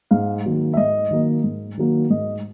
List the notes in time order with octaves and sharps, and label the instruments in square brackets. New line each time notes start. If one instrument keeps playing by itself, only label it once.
[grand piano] G#2 F5
D#3 F#3 A#3
E5
G#2 D#5
D#3 F#3 A#3
G#2
D#3 F#3 A#3
G#2 D#5